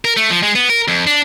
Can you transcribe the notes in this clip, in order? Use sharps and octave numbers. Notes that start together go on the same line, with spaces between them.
A#4
A3
F3
G#3
B3
A#4
F2
D4